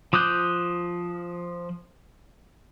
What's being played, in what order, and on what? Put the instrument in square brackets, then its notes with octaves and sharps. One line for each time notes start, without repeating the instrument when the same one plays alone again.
[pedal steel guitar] F3 D6 D#6 F#6 G6